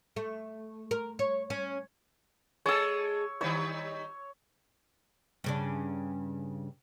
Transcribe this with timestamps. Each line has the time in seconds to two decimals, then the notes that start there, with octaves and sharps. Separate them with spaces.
0.16 A3
0.91 A#4
1.19 C#5
1.50 C#4
2.66 G#3 G#4 A4 C#5 E6
3.41 D#3 G3 D#4 C#5
5.44 G2 C#3 D4